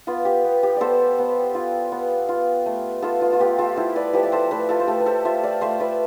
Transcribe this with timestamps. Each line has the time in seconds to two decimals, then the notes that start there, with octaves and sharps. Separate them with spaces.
0.07 B3 F4
0.25 G4
0.44 B3
0.63 G4
0.76 B3 A4 C5 D5
1.18 B3
1.55 F4
1.92 B3
2.29 F4
2.66 A3
3.02 B3 F4 A4
3.21 F4
3.33 F4
3.40 B3 G4
3.58 F4 A4
3.77 E4 A4 C5
3.96 B4 D5
4.13 F3 G4 B4
4.23 D5
4.32 A4 C5
4.51 A3 B4 D5
4.69 F4 A4
4.80 C5
4.87 A3 G4 B4
5.00 B4
5.06 A4 C5
5.25 F4 C5 E5
5.43 D5 F5
5.61 A3 C5 E5
5.80 B4 D5